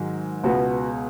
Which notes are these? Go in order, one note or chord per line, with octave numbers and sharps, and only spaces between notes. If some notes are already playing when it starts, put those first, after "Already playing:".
Already playing: G#2 D#3 F#3
C#2 B2 B3 F#4